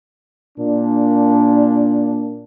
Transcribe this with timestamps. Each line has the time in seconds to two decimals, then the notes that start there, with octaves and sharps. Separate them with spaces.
0.58 A#2 D4